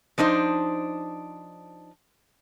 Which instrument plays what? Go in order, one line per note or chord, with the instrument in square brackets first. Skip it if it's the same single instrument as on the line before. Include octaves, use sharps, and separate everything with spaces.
[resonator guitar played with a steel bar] F3 D4 D#4 C5